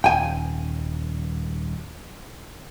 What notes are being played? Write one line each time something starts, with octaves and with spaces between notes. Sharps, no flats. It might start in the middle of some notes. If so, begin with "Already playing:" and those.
D#1 G5 G#5